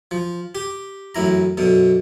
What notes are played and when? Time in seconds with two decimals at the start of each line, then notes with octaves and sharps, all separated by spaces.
0.11 F3
0.55 G4
1.15 A1 F#2 E4 A#5
1.57 F#2 B2 D3